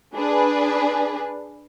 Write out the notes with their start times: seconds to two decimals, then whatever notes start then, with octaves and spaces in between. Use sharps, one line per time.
0.15 D4 G#4 B4